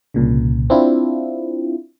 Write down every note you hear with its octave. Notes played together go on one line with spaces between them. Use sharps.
C2 A#2 C#3
C4 D4 E4 F4